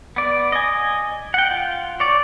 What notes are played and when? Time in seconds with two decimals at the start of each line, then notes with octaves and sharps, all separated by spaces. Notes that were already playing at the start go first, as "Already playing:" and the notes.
0.16 B3 D5
0.52 D#5 G#5
1.34 F#5 G5
1.51 F4
2.00 C#5 D5